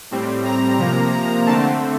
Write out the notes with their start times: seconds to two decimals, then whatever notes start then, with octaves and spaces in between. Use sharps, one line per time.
0.11 A2 G3 C4
0.45 A#5
0.79 C3 F3 A#3 A#5
1.13 A#5
1.46 D3 A3 C4 A5